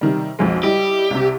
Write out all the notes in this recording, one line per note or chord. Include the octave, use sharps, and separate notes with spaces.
C3 D#3 G3
B1 F2 G#3
G3 E4 G4 D#5
C2 C3